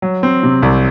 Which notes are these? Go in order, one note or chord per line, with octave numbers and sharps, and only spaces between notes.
F#3
C4
C3
C2